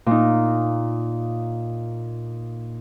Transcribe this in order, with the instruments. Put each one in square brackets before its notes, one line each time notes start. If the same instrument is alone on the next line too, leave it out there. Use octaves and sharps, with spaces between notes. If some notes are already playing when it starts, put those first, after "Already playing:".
[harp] A#2 D#4